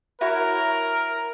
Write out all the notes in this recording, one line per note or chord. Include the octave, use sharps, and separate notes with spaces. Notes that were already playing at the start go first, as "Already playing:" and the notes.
E4 F#4 A#4 C#5